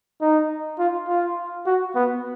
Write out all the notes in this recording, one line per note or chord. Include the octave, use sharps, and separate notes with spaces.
D#4
F4
F4
F#4
B3